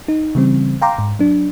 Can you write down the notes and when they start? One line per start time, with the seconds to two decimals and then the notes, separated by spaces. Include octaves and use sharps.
0.08 D#4
0.35 C#3 E3 G3 C4
0.82 F5 G5 A#5 C6 D6
0.98 G#2
1.19 F#3 D4